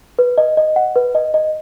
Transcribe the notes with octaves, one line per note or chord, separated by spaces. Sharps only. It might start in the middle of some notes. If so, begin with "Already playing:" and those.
B4
D#5
D#5
F#5
B4
D#5
D#5